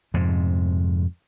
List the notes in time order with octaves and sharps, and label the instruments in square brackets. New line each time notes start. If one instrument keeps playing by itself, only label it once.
[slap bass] F2 G#2 C3